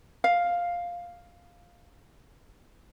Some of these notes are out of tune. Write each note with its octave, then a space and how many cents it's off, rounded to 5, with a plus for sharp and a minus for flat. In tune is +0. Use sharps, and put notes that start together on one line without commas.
F5 +5